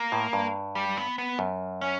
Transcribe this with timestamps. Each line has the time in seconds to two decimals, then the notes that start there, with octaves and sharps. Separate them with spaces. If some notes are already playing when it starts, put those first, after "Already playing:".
Already playing: A#3
0.12 A2
0.33 G2
0.75 G3
0.97 B3
1.18 B3
1.39 F#2
1.81 C#4